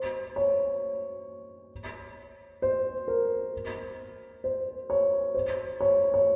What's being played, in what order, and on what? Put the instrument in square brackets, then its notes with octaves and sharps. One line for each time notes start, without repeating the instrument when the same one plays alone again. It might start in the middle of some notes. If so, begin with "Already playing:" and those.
Already playing: [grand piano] C5
C#5
C5
A#4
C5
C#5
C5
C#5
C#5